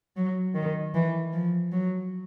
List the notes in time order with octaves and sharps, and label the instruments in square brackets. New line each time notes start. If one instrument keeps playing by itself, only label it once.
[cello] F#3
D#3
E3
F3
F#3